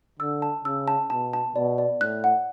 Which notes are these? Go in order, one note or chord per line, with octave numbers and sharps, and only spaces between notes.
D3 E6
A5
C#3 E6
A5
B2 A5
A5
B2 D5
D5
A2 F#6
F#5